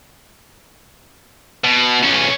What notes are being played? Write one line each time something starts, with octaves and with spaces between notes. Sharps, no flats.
B2
B1 C#4